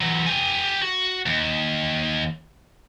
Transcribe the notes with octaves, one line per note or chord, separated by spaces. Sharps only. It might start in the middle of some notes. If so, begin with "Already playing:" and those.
E3 F#3
G4 G#5
F#4
D#2